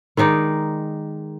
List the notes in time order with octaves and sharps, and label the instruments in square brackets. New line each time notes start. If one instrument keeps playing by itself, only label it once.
[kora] D#3 G#3 D#4 D5